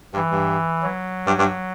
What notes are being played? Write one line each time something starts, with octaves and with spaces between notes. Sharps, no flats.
G2 E3
G2
F#3
G2
G2